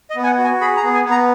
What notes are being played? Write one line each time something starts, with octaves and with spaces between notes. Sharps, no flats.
D#5
B3
G#5
F#5
F#4
G#5
G#4 B5
A#5
B3
G#5
B3
A#5